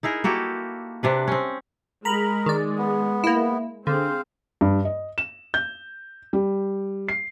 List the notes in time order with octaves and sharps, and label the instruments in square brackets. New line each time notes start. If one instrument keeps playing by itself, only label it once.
[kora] D#4 E4 G#4 A#4
A#3 F#4 G4 A4
C3 D4 B4
C4 C#4
[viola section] G#3 [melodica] A#4 [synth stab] A#5 B5
[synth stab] D#3 D5
[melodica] B3
[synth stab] A#3 E4
[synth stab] D3 [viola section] C4 G#4 [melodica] C5 F5
[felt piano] G2
D#5
E7
G6
G3
C7